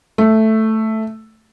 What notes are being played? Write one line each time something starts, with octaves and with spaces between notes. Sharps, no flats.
A3